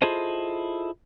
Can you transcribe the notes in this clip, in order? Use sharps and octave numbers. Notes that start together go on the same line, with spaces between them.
E4 F4 G#4 A4 C5 D#5